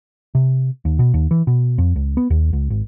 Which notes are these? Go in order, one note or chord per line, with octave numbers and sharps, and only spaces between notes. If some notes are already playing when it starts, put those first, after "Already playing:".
C3
D#2
B2
D#2
E3
B2
F2
C#2
B3
D#2
C#2
G#1